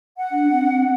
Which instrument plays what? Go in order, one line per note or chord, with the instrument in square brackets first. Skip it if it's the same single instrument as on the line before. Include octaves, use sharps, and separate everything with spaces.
[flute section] F#5
[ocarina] D4
C4